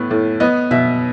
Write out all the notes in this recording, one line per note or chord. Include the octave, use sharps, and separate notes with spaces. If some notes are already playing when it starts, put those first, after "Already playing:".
Already playing: A2 B3
A2
B3 D#5
B2 E5